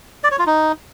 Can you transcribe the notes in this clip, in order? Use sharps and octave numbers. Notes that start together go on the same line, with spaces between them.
D5
C#5
F4
D#4